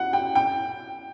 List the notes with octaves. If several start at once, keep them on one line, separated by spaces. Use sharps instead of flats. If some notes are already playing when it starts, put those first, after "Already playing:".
Already playing: F#5
G5
G5